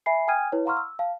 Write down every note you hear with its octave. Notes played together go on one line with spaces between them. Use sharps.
E5 G#5 B5 C7
G5 G#5 D#6 F6 G#6 D#7
E4 B4 C#5
F5 F#5 A#5 C6 C#6 F6
E6
F5 A5